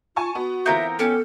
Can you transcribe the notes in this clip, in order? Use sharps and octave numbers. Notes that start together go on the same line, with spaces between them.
F4 G#5 A5 C#6
B3 F#4
E3 B3 C4 F4 A#4 E5 G6
B3 C#4 G4 A4